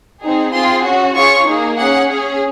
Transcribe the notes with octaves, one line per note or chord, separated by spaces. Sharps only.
C4 D#4 G#4
C4 F4 G#4 C6
C#4 F#4
C#4 F4 G#4 C#6
A#3 D#4 G#4
C#4 G#4 F#5
C#4 G#4